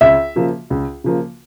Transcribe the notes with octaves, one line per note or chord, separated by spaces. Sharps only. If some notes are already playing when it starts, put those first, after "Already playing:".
C#2 E5
C#3 F3 A#3
C#2
C#3 F3 A#3